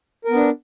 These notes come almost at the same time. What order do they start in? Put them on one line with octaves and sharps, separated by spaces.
A#4 B3 D4